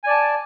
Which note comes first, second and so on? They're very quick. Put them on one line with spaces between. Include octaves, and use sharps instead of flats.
G#5 D5 A5